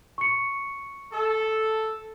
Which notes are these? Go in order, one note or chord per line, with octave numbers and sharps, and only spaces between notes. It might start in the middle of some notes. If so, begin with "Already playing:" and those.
C#6 C#7
A4